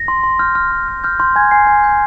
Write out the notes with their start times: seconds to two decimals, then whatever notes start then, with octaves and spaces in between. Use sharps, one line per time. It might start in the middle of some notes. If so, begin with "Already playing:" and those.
Already playing: A#6
0.08 C6
0.23 C6
0.39 F6 G6
0.55 F6
0.71 C6
0.88 F6
1.04 F6 G6
1.19 C6 G6
1.36 G#5 G#6
1.51 G#5 C7
1.67 G#5
1.84 G6